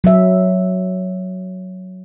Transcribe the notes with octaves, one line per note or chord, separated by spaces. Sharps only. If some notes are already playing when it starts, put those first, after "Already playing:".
F#3 E5